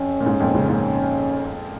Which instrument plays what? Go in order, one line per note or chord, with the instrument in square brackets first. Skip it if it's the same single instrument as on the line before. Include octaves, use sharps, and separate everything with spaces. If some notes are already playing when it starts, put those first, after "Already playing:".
Already playing: [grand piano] F2 [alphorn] C#4
[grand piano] A#2
G#2
F2 A#2
G#2 C#3
A#2
[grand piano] G#2 [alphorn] C#4